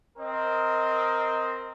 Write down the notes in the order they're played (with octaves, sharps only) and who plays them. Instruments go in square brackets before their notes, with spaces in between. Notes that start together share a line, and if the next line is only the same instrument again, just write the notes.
[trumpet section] C4 A#4 D#5